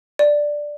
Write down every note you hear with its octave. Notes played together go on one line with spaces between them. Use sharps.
D5